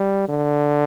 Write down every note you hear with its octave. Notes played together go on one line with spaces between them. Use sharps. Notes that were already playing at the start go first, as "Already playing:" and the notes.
Already playing: G3
D3